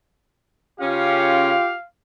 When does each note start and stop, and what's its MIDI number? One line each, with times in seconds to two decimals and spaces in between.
0.80 1.54 49
0.80 1.54 61
0.80 1.74 65
0.80 1.74 67
0.80 1.86 77